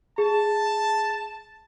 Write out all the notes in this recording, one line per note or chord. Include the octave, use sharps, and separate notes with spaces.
G#4 A5